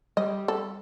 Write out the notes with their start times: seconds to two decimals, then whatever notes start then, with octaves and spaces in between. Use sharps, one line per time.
0.17 G3 D#5
0.48 A4